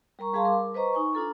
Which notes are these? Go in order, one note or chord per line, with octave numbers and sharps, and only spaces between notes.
G3 A#4 A#5 C#6
G3 G#4 F5 A5 C6
A#4 D6
B4 C5 D#5 A#5 C#6
D#4 G#5 C#6
D4 F4 A4 A#5